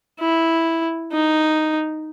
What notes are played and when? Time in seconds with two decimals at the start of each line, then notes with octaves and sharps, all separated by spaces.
0.20 E4
1.12 D#4